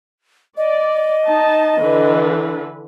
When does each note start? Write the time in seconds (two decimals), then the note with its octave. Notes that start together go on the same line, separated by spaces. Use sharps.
0.57 D5 D#5
1.26 D#4 A5
1.80 D3 E3 B4